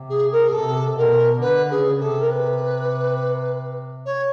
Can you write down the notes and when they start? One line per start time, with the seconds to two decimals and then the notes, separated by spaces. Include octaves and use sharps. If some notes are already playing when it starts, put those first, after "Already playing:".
Already playing: C3
0.09 G#4
0.31 A#4
0.48 G#4
0.53 C3 A4
0.97 B2 A#4
1.41 D3 B4
1.70 C#3 G#4
1.99 C3 A4
2.20 A#4
2.29 B4
4.05 C#5